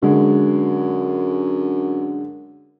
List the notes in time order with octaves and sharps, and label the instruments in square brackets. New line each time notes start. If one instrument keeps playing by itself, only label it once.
[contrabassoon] F#2 [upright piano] D3 G#3